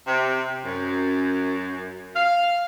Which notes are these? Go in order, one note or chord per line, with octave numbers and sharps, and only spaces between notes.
C3
F#2
F5